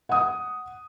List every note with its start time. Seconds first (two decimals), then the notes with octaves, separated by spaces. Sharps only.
0.09 F#5 D#6